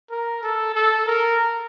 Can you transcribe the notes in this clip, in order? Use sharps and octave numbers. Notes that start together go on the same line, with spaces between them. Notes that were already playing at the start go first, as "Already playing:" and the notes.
A#4
A4
A4
A#4